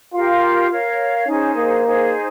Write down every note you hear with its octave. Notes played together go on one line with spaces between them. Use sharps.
F4 G4 A#4 F5
A#4 C#5 F5
C#4 D#4 G#4 C5
A#3
D#4 G#4 C5